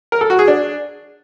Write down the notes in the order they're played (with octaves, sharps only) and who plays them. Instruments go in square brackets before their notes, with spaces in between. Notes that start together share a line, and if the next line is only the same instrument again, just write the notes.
[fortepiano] A#4
A4
F#4
G#4
D4